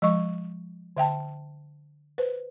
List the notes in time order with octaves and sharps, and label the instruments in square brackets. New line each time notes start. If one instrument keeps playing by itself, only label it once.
[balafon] F3 G#3 D#5 C#6
D3 E5 G5 A5
B4 C5